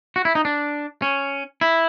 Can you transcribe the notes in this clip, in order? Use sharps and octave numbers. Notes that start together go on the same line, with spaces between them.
F#4
E4
D#4
D4
C#4
E4